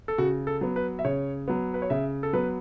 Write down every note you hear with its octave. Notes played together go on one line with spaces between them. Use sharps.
A4
C#3 F#4
A4
F#3 B3
B4
E5
C#3 C#5
F#3 B3
B4
C#5
C#3 E5
A4
F#3 B3 B4